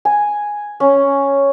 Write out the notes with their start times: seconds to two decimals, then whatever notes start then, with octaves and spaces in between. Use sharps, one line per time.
0.05 G#5
0.80 C#4